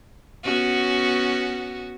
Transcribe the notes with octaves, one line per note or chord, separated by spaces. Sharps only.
B3 C#4 F#4